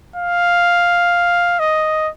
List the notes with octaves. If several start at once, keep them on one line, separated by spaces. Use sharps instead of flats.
F5
D#5